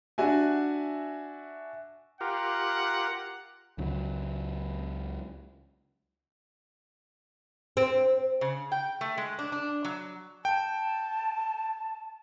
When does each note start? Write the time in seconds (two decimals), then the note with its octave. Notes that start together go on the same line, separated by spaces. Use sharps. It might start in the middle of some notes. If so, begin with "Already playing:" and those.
0.18 D4 F#4 E5 G#5
2.21 F4 G4 A#4 F#5
3.78 C#2 C#3 F#3
7.77 C4
8.41 C#3
8.72 G5
9.01 A3
9.18 G#3
9.39 D4
9.52 D4
9.85 F#3
10.45 G5 A5